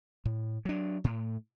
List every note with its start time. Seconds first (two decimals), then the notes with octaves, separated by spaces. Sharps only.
0.25 A2
0.65 F#3 D4
1.04 A2